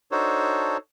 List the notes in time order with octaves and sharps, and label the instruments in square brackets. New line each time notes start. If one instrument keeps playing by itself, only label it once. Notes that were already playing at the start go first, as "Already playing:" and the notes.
[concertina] D4 D#4 F#4 A4 C5 C#5